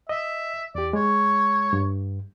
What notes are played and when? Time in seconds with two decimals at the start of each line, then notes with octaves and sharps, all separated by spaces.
0.09 D#5 E5
0.75 E2 G4 D5
0.93 G#3 C#5
1.73 G2